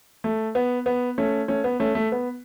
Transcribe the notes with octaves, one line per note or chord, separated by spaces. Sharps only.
A3
B3
B3
A3 C#4
A3 C#4
B3
A3 C#4
A3
B3